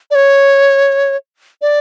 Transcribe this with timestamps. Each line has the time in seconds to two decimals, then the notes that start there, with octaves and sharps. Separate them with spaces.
0.11 D5
0.15 C#5
1.62 D5